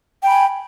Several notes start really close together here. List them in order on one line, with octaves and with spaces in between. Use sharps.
G5 B5 G#5